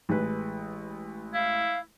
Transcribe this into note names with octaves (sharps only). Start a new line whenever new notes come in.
A1 G#3 B4
E4 F5